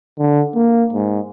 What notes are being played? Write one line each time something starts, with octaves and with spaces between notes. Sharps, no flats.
D3
A#3
G#2